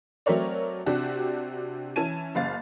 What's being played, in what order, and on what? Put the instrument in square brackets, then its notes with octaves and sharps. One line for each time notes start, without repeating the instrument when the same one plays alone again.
[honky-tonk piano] F#3 A3 C4 A#4 C#5 D5
C3 D4 F#4 G4
E3 C#4 A5 G#6 D#7
F#1 F5 A6